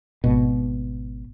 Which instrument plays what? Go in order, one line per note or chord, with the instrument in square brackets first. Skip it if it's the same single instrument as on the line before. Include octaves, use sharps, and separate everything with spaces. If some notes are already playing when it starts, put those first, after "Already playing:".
[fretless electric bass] G#1 B2